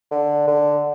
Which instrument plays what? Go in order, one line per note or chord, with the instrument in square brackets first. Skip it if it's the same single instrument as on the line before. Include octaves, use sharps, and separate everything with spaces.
[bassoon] D3
D3